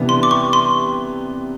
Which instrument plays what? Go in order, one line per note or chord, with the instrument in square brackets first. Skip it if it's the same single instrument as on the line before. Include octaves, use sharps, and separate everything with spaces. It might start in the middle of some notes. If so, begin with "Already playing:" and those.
Already playing: [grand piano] C3 E3 G3 B3 D4
[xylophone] C6
D6
C#6
C6